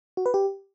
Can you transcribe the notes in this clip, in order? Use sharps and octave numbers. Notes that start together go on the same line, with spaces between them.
F#4
B4
G4